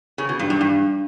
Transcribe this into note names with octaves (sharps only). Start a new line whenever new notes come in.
C#3
B2
G2
G2
G2